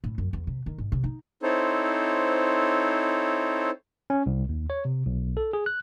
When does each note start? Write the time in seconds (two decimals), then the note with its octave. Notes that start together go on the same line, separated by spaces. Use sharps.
0.04 A2
0.18 F#2
0.33 E2
0.47 C3
0.66 D#3
0.78 G#2
0.92 C3
1.04 D#4
1.43 C4 D#4 E4 A4 C5 C#5
4.10 C#4
4.26 C2
4.49 D#2
4.70 C#5
4.85 C3
5.06 B1
5.37 A4
5.53 G#4
5.66 F#6